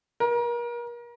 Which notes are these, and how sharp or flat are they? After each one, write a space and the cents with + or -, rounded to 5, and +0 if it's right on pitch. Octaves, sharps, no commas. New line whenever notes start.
A#4 +35